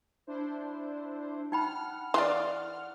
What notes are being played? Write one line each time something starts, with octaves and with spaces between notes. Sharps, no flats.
D4 E4 C5
D#4 F#5 G5 B5 F6
E3 D5 F5 C6